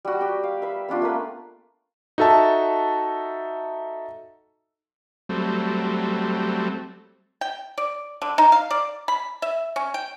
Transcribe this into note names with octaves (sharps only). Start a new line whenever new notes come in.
G3 F#4
G4 G5
F5
B4 E5
B3 C#4 D4 F4
A3 A#3 B4
D#4 F#4 A4 E5 A5
F#3 G3 A3 C4
G5
D5
D3
D#4
F5
D5
B5
E5
C#4
G5